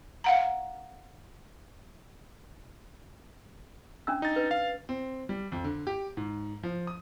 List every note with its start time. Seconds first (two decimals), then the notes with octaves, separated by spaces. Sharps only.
0.24 F5 F#5 A#5
4.07 C#4 D4 E6
4.22 D#4 A6
4.36 B4
4.51 F5
4.89 C4
5.29 G3
5.52 F2
5.64 D3
5.87 G4
6.17 G#2
6.63 F3
6.87 D#6